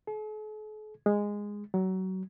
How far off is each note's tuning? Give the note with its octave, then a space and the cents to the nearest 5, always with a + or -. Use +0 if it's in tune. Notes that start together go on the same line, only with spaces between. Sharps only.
A4 -45
G#3 -10
F#3 +25